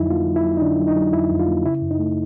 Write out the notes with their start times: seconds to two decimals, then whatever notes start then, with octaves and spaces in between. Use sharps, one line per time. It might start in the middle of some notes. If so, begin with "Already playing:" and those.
Already playing: F2 D3 F#3 D#4 E4
0.10 A#3 F4
0.27 F#3
0.36 E4
0.44 F#3
0.57 D#4
0.62 D3 D4
0.79 F#3
0.88 D#4
0.96 F#3
1.13 F2 E4
1.31 F2
1.39 F4
1.47 A#3
1.65 C#3 E4
1.82 F#2
1.91 D#4
1.99 A3